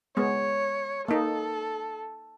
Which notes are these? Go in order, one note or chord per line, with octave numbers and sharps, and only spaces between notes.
G#3 B3 C#5
A#3 D#4 A4